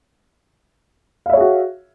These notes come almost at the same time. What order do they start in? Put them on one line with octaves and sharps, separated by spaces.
F5 E5 C#5 G#4 F#4